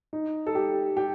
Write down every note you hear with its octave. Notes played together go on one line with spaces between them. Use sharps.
D#4
A4
G4
G4